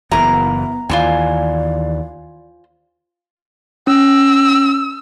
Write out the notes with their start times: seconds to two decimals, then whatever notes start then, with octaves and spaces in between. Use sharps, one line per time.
0.11 F#1 E3 B3 E4 A#4 A#5
0.89 D#2 E3 F4 C5 D5 G#5
3.87 C#4 E6